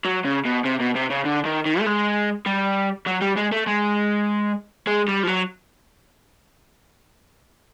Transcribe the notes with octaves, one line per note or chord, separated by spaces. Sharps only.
F#3
C#3
B2
C3
B2
C3
C#3
D3
D#3
D#3
A3
G#3
G3
F#3
G3
G#3
A3
G#3
G#3
G3
F3
F#3